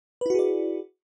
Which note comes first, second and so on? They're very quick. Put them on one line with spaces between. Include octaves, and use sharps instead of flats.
B4 E4 F#4 G#4 D5